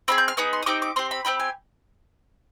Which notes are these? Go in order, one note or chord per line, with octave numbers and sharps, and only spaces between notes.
C4 F4 G#4 B5
G6
F6
B3 D#4 G#4 D#6
C6
D#6
C4 D#4 G4 D6
D6
C4 G4 C6
B5
C4 D#4 G4 B5
G#5